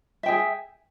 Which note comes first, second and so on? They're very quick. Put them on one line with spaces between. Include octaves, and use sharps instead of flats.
E5 G5 G#4